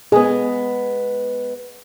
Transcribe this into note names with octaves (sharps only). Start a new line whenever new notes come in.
G#3 B3 G#4